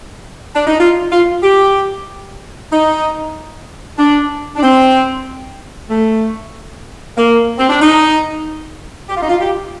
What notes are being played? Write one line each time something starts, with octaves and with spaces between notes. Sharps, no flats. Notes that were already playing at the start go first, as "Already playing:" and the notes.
D4
D#4
F4
F4
G4
D#4
D4
D4
C4
A3
A#3
C4
D4
D#4
G4
F4
D#4
F4
G4